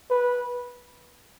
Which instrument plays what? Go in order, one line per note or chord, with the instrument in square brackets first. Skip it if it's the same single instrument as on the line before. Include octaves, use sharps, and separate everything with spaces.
[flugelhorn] B4